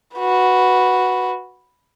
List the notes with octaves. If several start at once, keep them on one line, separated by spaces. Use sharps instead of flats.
F#4 B4